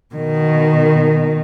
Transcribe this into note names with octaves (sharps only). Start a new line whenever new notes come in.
B2 D#3